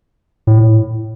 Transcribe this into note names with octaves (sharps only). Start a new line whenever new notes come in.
A2